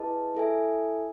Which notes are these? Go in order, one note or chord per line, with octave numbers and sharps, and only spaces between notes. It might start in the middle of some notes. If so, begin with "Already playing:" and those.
Already playing: E4 G#4 B4 D#5 A5
E4 A4 E5 G#5